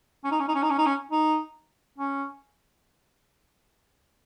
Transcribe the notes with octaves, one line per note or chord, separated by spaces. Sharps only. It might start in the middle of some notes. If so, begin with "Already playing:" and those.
C#4
D#4
C#4
D#4
C#4
D#4
C#4
D#4
C#4
D#4
C#4